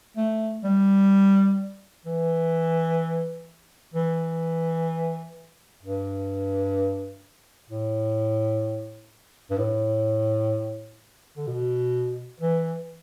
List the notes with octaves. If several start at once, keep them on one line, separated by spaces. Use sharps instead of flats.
A3
G3
E3
E3
G2
A2
G2
A2
D3
B2
E3